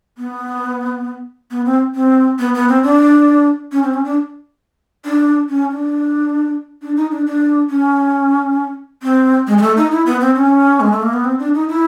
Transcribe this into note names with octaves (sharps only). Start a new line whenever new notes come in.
B3
B3
C4
C4
B3
B3
C4
D4
C#4
C4
C#4
D4
D4
C#4
D4
D4
D#4
D4
D4
C#4
C4
G#3
G#3
A3
D#4
E4
B3
C4
C#4
G#3
A3
A#3
B3
C4
D4
D#4
E4